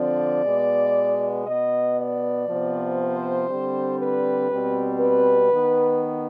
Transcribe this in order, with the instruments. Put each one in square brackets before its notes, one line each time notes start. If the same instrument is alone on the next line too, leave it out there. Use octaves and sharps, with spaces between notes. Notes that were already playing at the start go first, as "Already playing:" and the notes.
Already playing: [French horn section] D3 F3 C4 D5
B2 G#3 B3
B2 B3 D#5
D5
C3 F3 B3
C5
D3 G3 C4
B4
B2 G3 C4
B4
D#3 B3